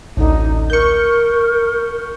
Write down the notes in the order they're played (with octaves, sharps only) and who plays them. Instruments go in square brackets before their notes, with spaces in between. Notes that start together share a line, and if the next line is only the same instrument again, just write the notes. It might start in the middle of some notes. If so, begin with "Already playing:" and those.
[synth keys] A1 D2 [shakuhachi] D#4
[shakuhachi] A#4 [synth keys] C#6 G6